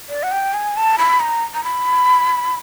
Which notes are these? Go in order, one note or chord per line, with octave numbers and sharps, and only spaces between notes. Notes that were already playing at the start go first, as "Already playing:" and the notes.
D5
F#5
G5
G#5
A5
B5
A#5
A#5
B5